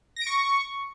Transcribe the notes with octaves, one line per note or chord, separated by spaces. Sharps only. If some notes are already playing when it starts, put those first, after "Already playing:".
A#6
D7
C#6